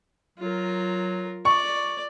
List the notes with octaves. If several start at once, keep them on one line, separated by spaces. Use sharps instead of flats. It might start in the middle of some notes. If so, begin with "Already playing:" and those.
F#3 F4 A#4
D5 C#6